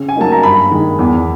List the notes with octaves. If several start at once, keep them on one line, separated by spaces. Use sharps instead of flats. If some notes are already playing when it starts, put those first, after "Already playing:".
Already playing: C#3
G#5
F#3 A#3 D#4 A5
A#5
G2 B5
D#3 G#3
E2